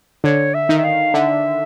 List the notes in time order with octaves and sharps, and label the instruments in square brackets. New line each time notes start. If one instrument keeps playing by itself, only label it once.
[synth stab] D3 [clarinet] C#5
[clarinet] E5
[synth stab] D#3
[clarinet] E5
F5
[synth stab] D3 [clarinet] E5